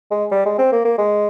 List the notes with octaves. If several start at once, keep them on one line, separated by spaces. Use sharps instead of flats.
G#3
G3
G#3
C4
A#3
A#3
G#3